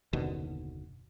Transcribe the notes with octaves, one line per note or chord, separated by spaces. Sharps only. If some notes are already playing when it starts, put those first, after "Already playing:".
F#1 D#2 B2 D3